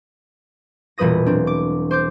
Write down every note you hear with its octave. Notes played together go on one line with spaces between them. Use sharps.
E1 A#2 G3 B4 D#6 A#6
F#3 C4 D4
D6
C5 D6 G6